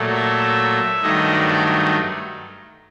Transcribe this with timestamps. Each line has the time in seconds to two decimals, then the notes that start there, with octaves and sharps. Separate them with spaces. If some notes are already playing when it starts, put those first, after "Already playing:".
Already playing: A#2 F#3 A3
0.15 E5
1.02 G2 D#3 F#3 A3 D#5
1.32 D5